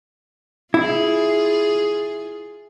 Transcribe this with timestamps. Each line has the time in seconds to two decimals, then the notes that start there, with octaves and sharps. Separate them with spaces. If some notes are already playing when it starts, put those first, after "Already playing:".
0.74 E4 F4 G#4